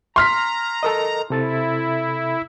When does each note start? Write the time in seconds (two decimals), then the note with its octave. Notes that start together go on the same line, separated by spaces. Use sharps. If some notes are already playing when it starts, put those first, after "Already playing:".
0.16 A#5 C6 F6 B6
0.83 A4 A#4 D#5
1.30 C3 E4 A4 A6